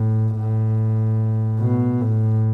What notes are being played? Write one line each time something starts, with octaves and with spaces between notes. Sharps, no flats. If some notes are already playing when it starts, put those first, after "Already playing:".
Already playing: A2
A2
B2
A2